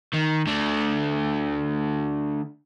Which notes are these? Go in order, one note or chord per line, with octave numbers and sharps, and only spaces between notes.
D#3
D3 A3